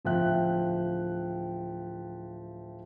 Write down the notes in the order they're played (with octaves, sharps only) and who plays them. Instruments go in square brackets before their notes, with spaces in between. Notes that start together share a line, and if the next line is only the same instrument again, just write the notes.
[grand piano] D1 F3 E5 G5 F#6